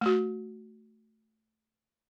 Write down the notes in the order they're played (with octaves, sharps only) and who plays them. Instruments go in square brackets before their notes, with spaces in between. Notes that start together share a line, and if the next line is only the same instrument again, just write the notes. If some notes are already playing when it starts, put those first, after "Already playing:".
[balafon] A3 F#4